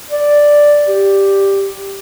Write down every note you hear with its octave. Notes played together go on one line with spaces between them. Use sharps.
D5
G4